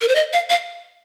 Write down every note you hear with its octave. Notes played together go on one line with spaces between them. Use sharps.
A#4
C5
D#5
F5
F5